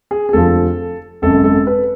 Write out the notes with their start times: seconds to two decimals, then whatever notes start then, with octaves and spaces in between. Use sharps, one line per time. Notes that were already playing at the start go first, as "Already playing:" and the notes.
0.11 G#4
0.29 G#4
0.33 F1 F2 D3 F3 A4
1.22 G#1 F#2 C#3 A4
1.44 A4
1.67 B4